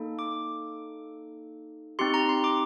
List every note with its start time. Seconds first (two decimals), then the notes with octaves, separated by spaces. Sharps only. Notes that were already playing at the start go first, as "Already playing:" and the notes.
Already playing: A#3 D#4 A4
0.19 D6
1.99 C4 D#4 G4 C6
2.14 A#5
2.29 C6
2.44 D6